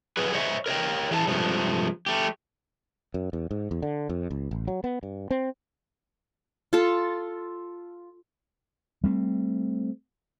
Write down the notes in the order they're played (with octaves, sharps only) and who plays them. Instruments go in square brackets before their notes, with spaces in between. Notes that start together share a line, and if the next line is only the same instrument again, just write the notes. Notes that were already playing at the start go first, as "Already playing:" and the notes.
[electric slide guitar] F#3 G#4 B4
C5 C#5 D#5 E5 F#5 G#5
A#4 C#5 D#5 G5
E3 G#4 E5 A5
G2 C3 F3 G#3 A3
A3 G4
[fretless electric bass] F#2
E2
G#2
E2
D3
F2
C#2
A1
F#3
B3
G2
C4
[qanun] F4 A4
[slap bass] G3 A3 C4